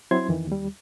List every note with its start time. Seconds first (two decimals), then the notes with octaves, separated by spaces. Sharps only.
0.11 F#3 C4 E4 C5 C6 G#6
0.29 F2 D#3 E3
0.47 D#2 G3